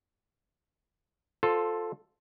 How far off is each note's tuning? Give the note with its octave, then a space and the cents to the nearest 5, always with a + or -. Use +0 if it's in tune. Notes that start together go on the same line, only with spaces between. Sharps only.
F4 +15 A4 +0 C5 +0